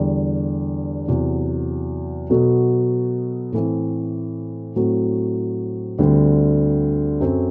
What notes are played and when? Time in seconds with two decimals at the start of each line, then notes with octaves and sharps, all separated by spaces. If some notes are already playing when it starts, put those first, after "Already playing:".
Already playing: E2 D3 G3
1.08 E2 C3 F#3
2.30 B2 F#3 B3 F#4 A4
3.52 A2 E3 A3 C4
4.76 A2 F#3 A3 C4 F#4
5.99 D2 D3 G3 C4
7.21 F#2 F#3 C4 F#4 A4